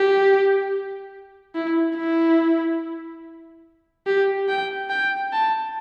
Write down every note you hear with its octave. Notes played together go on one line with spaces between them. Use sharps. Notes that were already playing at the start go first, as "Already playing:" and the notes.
Already playing: G4
E4
E4
G4
G5
G5
A5